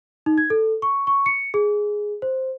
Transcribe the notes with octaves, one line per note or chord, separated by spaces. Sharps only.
D#4
G#6
A4
C#6
C#6
C#7
G#4
C5